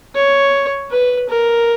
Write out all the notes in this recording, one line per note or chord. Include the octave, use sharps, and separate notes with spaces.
C#5
B4
A#4